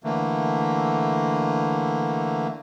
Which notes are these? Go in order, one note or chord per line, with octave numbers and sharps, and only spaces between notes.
D3 E3 A3 A#3